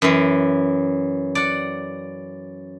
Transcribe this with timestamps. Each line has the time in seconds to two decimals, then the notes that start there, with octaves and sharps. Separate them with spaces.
0.02 F#2 E3
1.35 D5 F#5